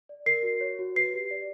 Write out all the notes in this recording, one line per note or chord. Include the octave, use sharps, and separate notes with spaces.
D5
A#4 C7
F#4
C#5
F#4
B4 C7
G4
D5